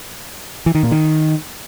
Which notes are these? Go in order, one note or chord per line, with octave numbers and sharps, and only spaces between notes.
E3
D#3
A#2
D#3